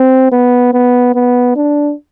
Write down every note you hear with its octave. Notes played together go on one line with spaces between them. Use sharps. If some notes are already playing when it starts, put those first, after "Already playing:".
Already playing: C4
B3
B3
B3
D4